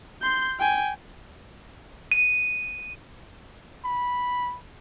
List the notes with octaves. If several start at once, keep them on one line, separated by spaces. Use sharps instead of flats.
C6 G6
G5 G#5
D#7
B5